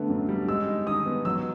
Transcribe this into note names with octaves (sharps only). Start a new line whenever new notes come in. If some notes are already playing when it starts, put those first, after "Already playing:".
Already playing: D3 A3 B3
F#2
G3
G#3 E6
D#4
D#3 D#6
B3
F#3 E6